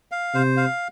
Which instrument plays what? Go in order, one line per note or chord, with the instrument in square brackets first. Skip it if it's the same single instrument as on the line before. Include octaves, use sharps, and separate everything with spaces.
[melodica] F5
[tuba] C3 [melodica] C5
[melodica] F5